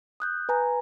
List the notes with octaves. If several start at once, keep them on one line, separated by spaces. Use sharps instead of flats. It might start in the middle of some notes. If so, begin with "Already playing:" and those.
D#6 F#6 G6
B4 G#5 A#5